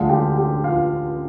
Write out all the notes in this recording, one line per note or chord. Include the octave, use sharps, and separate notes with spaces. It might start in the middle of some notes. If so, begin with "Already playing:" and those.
Already playing: D2 D3 G#3 F4 F5
G4 G5
G4 G5
F4 F5